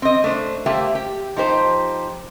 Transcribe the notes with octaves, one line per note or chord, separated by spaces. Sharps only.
C4 D#5
A3 D4 C5
A3 A#3 G4 C5 E5
G4
F3 D#4 G4 C5